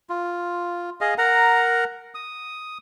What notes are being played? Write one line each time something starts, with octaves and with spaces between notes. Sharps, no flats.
F4
G#4 D#5 F5
A#4 F#5 A#5
D#6